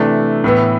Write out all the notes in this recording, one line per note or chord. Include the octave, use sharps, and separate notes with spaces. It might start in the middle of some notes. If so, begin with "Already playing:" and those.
Already playing: C3 E3 A3 D4
A2 E3 B3